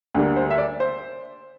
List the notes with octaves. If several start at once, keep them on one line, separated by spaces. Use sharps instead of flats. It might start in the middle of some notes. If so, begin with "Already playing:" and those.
D2 D3 G3 A#3
C5
E5
D5
C5